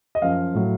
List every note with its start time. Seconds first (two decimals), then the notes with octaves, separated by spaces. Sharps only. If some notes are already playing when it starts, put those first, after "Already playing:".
0.15 D#5
0.22 F#2 F3 F5
0.54 A2 F#3